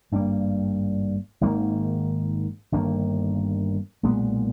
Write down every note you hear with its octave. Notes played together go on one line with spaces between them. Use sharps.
G#1 G2 G3 A#3
G#1 G#2 D#3 A#3
G1 G2 D#3 A#3
B1 A#2 G#3 B3